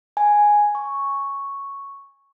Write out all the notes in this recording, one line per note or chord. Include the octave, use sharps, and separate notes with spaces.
G#5
C#6